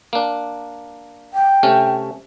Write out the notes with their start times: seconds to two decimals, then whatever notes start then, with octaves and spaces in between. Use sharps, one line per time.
0.13 A#3 D4
1.34 G5
1.63 C3 A3 C#4